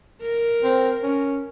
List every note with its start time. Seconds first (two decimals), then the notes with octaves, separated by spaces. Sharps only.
0.22 A#4
0.63 C4
1.03 C#4